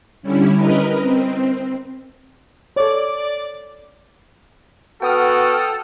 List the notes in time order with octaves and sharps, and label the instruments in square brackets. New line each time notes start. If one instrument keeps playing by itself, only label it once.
[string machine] D3 G3 C#4 E4
A#4 B4 D#5
C4
[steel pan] A4 C#5 [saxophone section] D5
[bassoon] B3 [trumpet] F#4 [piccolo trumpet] A4 [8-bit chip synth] G5 D#6 F6